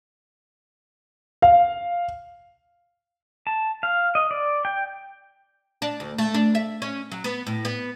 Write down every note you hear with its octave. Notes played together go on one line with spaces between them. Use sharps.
F5
A5
F5
D#5
D5
G5
D4
D2
A3
D4
E5
C#4
F#3
B3
A2
B3